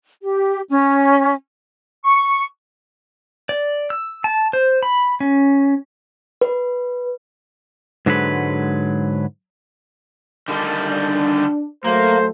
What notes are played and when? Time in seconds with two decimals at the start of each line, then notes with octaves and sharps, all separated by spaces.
0.22 G4
0.68 C#4
2.05 C#6
3.49 D5
3.90 E6
4.24 A5
4.53 C5
4.83 B5
5.20 C#4
6.41 B4
8.06 G#2 D3 F#3 G#3 B4
10.48 D3 D#3 G3
10.89 D4
11.84 F#3 A3 A#3 C5